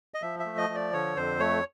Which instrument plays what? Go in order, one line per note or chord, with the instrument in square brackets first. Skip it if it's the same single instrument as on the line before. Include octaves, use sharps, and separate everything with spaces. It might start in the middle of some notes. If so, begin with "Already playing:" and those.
[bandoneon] D#5
F3 E5
E5
A3
D#5
F3
D5
D3 C#5
F2 C5
A3 C#5